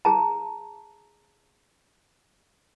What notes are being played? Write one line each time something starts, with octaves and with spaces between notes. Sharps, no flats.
G#4 A5 A#5